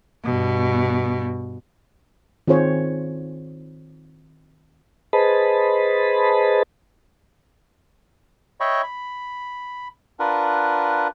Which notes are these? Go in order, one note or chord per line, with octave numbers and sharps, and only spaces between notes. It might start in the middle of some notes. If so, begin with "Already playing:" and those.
G2 B2
D#3 C4 F4 G#4 C5 C#5
G#4 B4 C5 D#5 A5 B5
C#5 D#5 E5 G5 B5 C#6
B5
D4 F4 A#4 B4 F#5